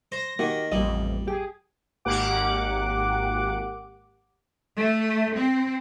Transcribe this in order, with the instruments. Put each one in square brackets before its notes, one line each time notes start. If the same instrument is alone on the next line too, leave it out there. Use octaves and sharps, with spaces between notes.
[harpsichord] C5 [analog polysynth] A#6
[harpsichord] D#3 [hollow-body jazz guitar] A#3 F#4 G4
[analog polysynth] A1 F2 [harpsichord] G3 [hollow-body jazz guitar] A#3 D#5
[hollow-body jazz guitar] G4 [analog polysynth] G#4
[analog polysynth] G#1 A#3 G4 F#5 D6
[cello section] A3
C4